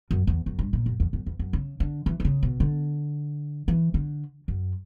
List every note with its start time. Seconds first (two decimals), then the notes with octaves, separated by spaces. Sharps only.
0.11 F#2
0.27 E2
0.46 F#2
0.59 G2
0.73 A#2
0.86 F#2
1.00 E2
1.13 F#2
1.26 E2
1.39 F#2
1.53 C#3
1.80 D3
2.06 E3
2.20 D3
2.25 C#3
2.43 B2
2.60 D3
3.68 E3
3.94 D3
4.48 F#2